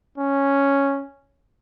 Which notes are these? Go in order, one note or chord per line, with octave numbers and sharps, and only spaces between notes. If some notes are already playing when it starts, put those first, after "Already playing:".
C#4